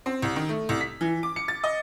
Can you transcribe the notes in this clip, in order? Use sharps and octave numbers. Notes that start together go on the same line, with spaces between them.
C4
C2
D#3
A3
C2
B6
E3
D6
C#7
A6
D#5